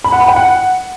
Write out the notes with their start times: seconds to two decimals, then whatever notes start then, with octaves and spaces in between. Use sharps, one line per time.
0.04 B5
0.12 F#5
0.20 B5
0.28 G5
0.36 F#5